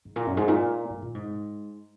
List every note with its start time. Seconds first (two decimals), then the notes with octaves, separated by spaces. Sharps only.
0.05 G#2
0.16 A#2
0.27 F#2
0.37 G#2
0.48 A#2
0.90 G#2
1.02 A#2
1.15 G#2